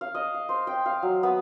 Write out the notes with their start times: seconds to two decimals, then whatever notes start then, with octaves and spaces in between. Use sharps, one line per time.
0.01 F5
0.15 D#5
0.34 F5
0.49 C5
0.67 G5
0.86 F5
1.03 F#3
1.23 B3